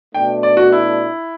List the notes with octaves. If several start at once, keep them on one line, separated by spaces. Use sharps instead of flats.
B2 A3 D4 G5
D5
F#4
E4